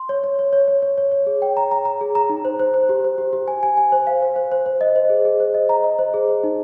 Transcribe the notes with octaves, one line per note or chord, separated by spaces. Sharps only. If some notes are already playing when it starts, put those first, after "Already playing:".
Already playing: C6
C#5
C#5
C#5
C#5
C#5
C#5
C#5
C#5
G#4
G5
A#5
A#5
A#5
G#4
A#5
D#4
C5
C5
C5
G4
C5
G4
G4
G#5
G#5
G#5
C5
F5
C5
C5
C5
C5
D#5
C5
G#4
G#4
C5
D#5
A#5
D#5
C5
G#4
C5
D#4